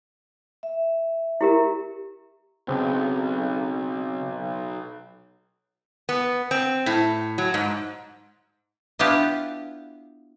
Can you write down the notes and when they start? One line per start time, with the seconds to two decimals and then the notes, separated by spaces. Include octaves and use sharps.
0.63 E5
1.41 E4 G4 A#4
2.68 B1 C#3 C4
6.09 B3
6.51 C4
6.86 A2
7.38 F#3
7.54 G#2
8.99 B3 D4 E4 F4 G4